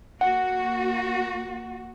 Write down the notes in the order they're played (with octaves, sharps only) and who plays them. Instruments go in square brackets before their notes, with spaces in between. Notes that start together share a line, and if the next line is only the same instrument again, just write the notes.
[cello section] A#3 F#4 [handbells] F#5